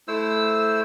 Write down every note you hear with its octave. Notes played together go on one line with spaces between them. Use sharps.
A3 E4 C5 E6